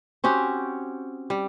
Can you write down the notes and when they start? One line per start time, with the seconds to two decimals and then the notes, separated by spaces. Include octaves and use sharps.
0.24 C4 C#4 F#4 G4
1.30 G3